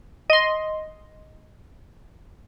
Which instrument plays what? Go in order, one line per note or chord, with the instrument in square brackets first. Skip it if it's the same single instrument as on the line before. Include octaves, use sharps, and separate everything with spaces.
[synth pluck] D#5 C6